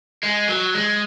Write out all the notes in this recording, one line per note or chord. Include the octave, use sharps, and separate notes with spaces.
G#3
F#3
G#3